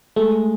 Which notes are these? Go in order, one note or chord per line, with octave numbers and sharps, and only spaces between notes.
G#3 A3